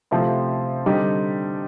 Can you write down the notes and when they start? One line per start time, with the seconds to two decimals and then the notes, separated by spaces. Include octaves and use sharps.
0.11 C3 F3 A3 C4 E4
0.86 D3 G3 C4 D#4 G4